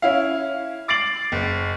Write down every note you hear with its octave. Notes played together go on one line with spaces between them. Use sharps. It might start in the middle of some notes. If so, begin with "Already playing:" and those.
C#4 E4 F5
D6 A6 C7 D7 F#7
F#1